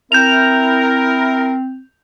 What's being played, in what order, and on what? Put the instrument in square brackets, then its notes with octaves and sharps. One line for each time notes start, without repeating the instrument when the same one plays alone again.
[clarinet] C4 [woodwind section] E4 A#4 [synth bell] G6 F7